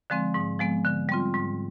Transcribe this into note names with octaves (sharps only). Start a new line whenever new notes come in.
D3 F3 G#3 C4
G#2
F3 G#3 B3
D3
G3 C4 F4
G#2